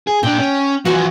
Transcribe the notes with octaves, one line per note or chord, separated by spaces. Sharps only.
G#4
A#2 D4 G5
C#4
E3 F3 F#4 D#5 G#5